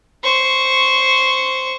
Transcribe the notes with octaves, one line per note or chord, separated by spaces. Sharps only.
C5 C#6